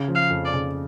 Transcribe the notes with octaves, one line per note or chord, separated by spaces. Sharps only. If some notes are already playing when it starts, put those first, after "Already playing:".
Already playing: C#3
F3
F5
F2
D5
C#3